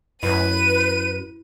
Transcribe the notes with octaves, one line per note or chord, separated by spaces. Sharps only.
F#2 E4 B4 D#7